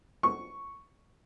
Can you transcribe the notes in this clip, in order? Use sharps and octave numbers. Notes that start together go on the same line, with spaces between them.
C#6